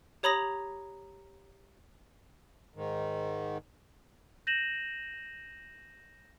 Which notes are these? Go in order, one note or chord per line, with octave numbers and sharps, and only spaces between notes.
G4 C#5 A#5 B5 D#6 A#6
G#2 D#3
G6 A#6 D#7 E7 F#7